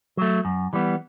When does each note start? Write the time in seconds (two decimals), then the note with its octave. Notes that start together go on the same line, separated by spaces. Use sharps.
0.17 F#3 A3
0.45 F#2
0.73 E3 G3 B3